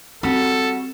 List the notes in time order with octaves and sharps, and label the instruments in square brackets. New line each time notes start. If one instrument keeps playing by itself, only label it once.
[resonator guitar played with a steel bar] G3 F#4 [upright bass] C4 [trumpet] A4